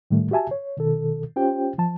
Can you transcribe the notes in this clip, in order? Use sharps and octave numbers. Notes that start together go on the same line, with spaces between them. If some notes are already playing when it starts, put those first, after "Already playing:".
A2 D#3 G3 A3
F#4 G4 E5 G#5 A5
C#5
B2 D#3 A4
C#4 F4 G4 C5 G5
F3 A5